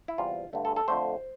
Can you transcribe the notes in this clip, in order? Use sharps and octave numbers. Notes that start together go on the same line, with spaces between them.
E4
E2 C3 G3 F4
G2 D3 A3
A4
A4
F2 D3 A3 C5